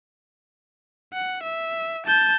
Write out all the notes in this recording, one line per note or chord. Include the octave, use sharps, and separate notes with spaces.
F#5
E5
A5 G6